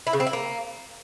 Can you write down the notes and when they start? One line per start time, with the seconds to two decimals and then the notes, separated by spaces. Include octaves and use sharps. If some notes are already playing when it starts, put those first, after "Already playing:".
0.07 E4
0.13 C#3
0.20 C4
0.27 E4
0.33 A#3